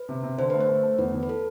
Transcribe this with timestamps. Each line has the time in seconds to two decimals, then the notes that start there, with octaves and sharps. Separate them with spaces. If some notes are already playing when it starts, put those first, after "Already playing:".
Already playing: B4
0.09 C3
0.23 C3
0.38 D3 C5
0.50 A3 B4
0.61 C5
0.69 A3
0.83 A3
0.98 E2 B4
1.14 E2
1.23 B4
1.29 A4